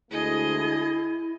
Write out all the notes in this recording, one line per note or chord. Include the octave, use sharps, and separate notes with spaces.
D2 G#3 A3 E4 G#4 D#5